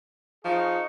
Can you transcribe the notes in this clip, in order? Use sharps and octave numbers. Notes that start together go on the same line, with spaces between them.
F3 D#4 G#4 C#6